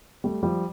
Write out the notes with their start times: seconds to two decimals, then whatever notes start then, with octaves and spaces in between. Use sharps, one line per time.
0.24 G3 A3
0.43 F3 G3